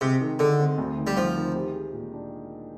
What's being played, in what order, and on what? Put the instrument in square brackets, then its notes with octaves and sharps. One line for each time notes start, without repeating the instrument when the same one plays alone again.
[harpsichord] C3 [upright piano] G#3
[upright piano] D#3
[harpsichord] D3 [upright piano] G#3
[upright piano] C4
D2
D#3
[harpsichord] G3
[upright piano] D#3 [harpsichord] F3
[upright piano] D#3
G4
G#3
A#2
D4